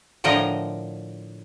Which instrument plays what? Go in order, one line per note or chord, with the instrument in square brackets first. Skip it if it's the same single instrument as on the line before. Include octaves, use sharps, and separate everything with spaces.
[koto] A2 D3 F3 A#4 D#5